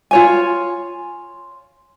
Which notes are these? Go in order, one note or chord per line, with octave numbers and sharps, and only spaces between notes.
F4 C#5 G#5